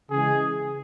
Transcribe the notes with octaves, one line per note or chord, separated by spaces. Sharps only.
C#3 E3 G#3 G#4